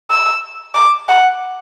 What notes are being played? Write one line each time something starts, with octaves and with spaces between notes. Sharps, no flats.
E6
D6
F#5